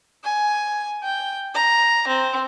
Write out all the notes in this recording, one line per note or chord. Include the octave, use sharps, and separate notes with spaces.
G#5
G5
A#5
C4